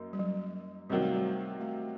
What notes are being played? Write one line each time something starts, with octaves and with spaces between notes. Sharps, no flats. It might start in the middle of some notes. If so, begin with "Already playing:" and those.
Already playing: F#2 A#3 D#4
G3
F#3
C3 D#3 F#3 G3
A3
G3
A3